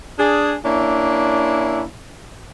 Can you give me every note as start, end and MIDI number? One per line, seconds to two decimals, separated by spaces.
0.19 0.56 62
0.19 0.56 68
0.65 1.83 58
0.65 1.83 61
0.65 1.83 62
0.65 1.83 64